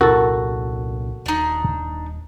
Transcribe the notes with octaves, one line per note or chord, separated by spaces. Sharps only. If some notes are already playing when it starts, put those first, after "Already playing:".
C2 A#2 E4 F#4 G4 A4 A#4
D#1 D4 D#4